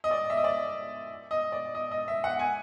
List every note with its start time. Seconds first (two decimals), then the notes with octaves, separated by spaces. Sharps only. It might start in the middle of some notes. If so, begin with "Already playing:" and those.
0.04 D#5
0.11 D5
0.30 E5
0.37 D#5
0.44 D5
1.31 D#5
1.52 D5
1.75 D#5
1.91 D#5
2.08 E5
2.24 F#5
2.39 G#5